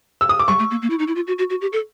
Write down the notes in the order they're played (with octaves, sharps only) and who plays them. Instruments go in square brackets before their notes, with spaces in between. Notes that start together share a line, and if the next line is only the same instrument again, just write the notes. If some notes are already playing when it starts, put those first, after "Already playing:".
[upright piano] E6
D#6
D6
[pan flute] G3 [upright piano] C#6
[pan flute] A3
A#3
A#3
E4
D#4
E4
F4
F#4
F#4
F#4
G4
A4